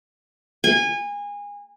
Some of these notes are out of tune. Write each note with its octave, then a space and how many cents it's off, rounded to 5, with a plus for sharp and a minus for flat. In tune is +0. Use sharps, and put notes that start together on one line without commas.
G#5 -25